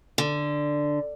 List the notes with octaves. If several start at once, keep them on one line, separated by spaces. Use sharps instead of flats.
D3